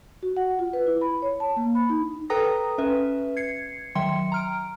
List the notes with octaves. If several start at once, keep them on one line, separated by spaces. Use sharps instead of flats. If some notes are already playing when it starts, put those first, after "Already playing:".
F#4
F#5
F4
B4
E4
B5
C#5
A5
A#3
B5
D#4
A4 B4 G5 A#5 D#6 A#6
C#4 B4 E5
G#6 C7 C#7
D#3 F#3 E5 G5 C6 C#7
A#5 F6 D7